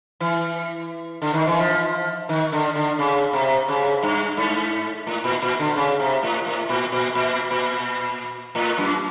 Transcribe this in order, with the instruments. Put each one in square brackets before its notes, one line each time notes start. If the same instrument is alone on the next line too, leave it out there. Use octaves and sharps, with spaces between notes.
[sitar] E3
D3
D#3
E3
F3
D#3
D3
D3
C#3
C3
C#3
G2
G#2
A2
A#2
A#2
D3
C#3
C3
A2
A2
A#2
A#2
A#2
A#2
A2
F#2